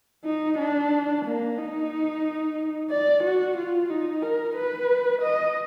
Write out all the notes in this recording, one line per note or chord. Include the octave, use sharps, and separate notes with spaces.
D#4
D4
A#3
D#4
D5
F#4
F4
D#4
A#4
B4
D#5